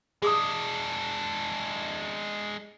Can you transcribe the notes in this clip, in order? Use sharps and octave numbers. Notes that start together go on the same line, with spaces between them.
G#3 D4 G#4 D6 D#6